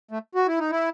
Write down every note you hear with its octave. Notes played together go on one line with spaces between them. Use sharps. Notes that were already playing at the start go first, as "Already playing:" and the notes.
A3
F#4
E4
D#4
E4